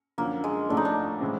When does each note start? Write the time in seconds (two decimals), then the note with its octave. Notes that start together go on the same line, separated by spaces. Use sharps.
0.18 F#2 D3 F3 A#3
0.44 G#3
0.69 A1 A2 F3 A3 D4
0.77 D#4
0.85 D4
1.20 A2 E3 G#3 C4